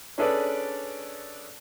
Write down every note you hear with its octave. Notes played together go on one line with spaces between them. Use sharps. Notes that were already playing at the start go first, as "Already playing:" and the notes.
C#4 D4 G#4 A4 B4 D5